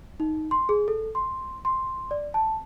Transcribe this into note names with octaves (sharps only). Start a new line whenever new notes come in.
D#4
C6
G#4
A4
C6
C6
D5
A5